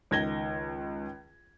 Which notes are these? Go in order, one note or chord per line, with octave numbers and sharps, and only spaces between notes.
C#2 D#3 G#6 A#6 G7